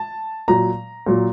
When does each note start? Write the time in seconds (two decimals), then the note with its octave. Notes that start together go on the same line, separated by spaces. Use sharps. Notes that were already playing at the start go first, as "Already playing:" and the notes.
Already playing: A5
0.48 A#2 F#3 A#5
1.06 A#2 F#3